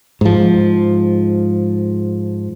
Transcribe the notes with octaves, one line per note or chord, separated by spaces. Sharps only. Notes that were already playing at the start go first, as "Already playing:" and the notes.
G#2 F3